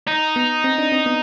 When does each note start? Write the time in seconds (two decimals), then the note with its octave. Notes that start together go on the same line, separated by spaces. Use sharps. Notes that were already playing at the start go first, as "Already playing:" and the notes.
0.08 D#4
0.36 B3
0.64 C4
0.78 D4
0.92 C4
1.06 B3